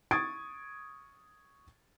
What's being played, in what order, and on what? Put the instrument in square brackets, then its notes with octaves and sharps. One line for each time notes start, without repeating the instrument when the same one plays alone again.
[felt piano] C#6 D#6 G#6 A6 D7